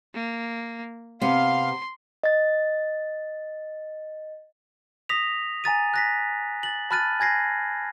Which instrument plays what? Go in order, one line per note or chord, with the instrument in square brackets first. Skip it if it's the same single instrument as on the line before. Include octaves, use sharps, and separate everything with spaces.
[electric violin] A#3
[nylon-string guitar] C3 B3 [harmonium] F5 [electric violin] C6
[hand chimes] D#5 A6
[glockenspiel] D#6 A#6 B6 F7
G#5 A#5 A6 D#7
F#6 A#6 B6
A6 F#7
A5 B5 F6 F#6 A6 D#7
G#5 G#6 A#6 C7